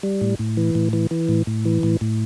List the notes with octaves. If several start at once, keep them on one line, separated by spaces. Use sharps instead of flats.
G3
A2
A2
E3
A2
E3
E3
A2
A2
E3
A2
A2